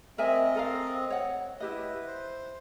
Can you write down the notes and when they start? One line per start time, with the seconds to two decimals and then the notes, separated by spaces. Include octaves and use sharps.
0.18 C4 A#4 D#5 E5 G#5
0.55 A4 A#4 F5
1.10 C#5 F#5
1.60 E4 G4 B4 D#5
2.07 C5